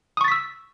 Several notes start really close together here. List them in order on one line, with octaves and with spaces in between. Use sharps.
D#6 C#6 A6 B6 E6